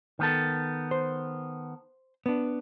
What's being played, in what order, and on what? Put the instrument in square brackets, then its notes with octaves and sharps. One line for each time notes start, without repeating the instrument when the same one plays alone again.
[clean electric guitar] D#3 B3 A4
[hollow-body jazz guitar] C5
B3 D4